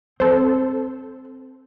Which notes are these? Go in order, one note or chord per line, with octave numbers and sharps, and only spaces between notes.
C4 A4 C5